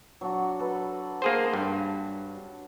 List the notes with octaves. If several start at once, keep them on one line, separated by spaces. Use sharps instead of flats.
F#3 D4 F#4
A4 B4
A#3 G#4 C5
G2